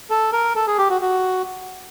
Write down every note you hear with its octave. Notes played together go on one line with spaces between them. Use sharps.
A4
A#4
A4
G#4
G4
F#4
F#4